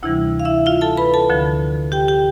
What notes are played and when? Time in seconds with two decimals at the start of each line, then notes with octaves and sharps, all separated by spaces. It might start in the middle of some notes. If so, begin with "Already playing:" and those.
0.03 D2 C3 E3 G3 E4
0.40 F5
0.45 E4 E5
0.66 F4 F5
0.81 A4 A5
0.97 B4 B5
1.14 A4 A5
1.29 D2 D3 F3
1.92 G4 G5
2.08 G4 G5